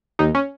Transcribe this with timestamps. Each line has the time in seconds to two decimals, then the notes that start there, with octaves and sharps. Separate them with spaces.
0.19 D#2 D#4
0.35 C#4